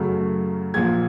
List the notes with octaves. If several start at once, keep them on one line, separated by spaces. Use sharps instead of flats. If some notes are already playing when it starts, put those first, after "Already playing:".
Already playing: F#2 C#3 F#3 A3
A#1 A#2 F3 G#6